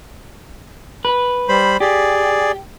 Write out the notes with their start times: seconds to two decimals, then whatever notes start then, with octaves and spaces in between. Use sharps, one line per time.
1.05 B4
1.49 G3 C5 B5
1.80 G4 G#4 D5